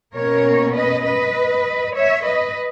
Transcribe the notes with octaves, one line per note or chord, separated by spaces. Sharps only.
B2 A#3 C#4 A#4 C#5
B4 D#5
B4 D#5
C#5 E5
B4 D#5